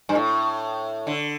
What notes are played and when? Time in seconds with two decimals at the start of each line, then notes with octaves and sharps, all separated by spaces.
0.09 G2
0.16 A2
1.07 D3